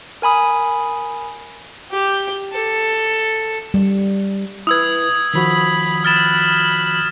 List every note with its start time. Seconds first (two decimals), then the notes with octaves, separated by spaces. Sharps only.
0.22 A#4 G#5 B5 D#6
1.91 G4
2.53 A4
3.74 G3
4.67 E4 B4 D#6 E6 G#6
5.34 D#3 F3 F#4 B5
6.04 B5 F6 F#6 A6 E7